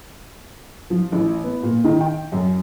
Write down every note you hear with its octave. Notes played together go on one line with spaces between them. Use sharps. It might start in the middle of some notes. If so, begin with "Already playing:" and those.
F3
A1
B3
A#2
D#3
G5
F#2